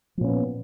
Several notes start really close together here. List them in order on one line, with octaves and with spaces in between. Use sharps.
F3 A#2 C#4 B3